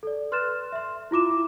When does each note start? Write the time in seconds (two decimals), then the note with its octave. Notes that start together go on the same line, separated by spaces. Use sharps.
0.03 A4 D5
0.32 B4 C6 F6 F#6 A6 E7
0.72 E5 C6
1.11 E4 F4 D6 E7